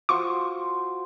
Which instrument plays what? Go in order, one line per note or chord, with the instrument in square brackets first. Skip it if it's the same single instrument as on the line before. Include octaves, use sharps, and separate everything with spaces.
[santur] F4 F#4 C5 [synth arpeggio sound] C#6